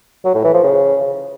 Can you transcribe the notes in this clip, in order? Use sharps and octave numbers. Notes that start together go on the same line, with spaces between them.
F#3
A2
E3
F3
C#3